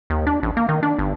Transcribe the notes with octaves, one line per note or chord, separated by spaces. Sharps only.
D#2
D4
A1
A#3
D#3
D4
G1